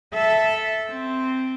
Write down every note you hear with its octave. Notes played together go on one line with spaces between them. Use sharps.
A4 E5
C4